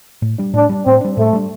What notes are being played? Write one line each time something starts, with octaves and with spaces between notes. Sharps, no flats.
A2
G3 D4
A2 D4
G3 D4
A2 C4
G3 D4
A2 A3
G3 D4